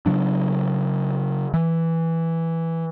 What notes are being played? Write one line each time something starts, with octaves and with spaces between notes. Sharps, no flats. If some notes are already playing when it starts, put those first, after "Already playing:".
C#3 F#3 D4
E3